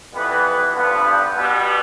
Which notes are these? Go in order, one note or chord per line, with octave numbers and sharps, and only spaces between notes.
F2 E3 G3 B3 B4
G2 D3 F3 B3
G4
B2 G3 B3